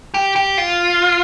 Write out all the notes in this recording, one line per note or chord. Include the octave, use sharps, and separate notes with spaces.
G4
G4
F4